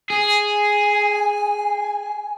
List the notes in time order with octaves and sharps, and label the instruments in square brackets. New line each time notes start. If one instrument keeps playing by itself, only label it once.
[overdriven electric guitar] G#4 [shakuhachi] G#5